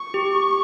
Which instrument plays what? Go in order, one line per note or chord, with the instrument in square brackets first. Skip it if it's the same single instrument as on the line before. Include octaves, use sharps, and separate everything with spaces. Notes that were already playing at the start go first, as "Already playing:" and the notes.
Already playing: [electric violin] C#6
[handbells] G4